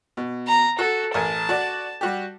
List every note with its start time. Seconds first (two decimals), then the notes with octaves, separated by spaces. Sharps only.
0.17 B2
0.47 A#5
0.79 F#4 A4
1.14 A1 A#4 G#5 A5
1.49 F#4 D5
2.01 G3 F#4 G4